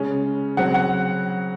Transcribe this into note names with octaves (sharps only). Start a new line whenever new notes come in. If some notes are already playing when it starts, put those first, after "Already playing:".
Already playing: C#3 G#3 C#4
C#3 F#3 C4 F#5
F#5